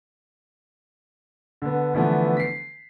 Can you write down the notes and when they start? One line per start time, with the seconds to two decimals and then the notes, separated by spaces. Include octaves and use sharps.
1.62 D3 B3
1.94 D3 E3 F3 A3 B3
2.37 B6 C7